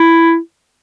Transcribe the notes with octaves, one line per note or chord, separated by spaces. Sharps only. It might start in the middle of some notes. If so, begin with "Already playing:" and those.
Already playing: E4